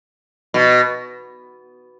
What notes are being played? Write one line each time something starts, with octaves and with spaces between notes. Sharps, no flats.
B2